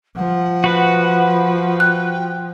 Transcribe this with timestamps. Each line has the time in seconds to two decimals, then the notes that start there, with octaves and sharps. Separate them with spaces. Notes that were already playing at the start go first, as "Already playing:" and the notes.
0.16 F3 F#5
0.64 F#4 B4
1.80 G5 F#6